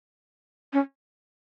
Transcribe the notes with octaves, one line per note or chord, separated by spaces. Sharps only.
C#4